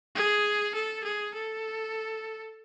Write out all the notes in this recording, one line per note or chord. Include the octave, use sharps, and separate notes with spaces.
G#4
A4
G#4
A4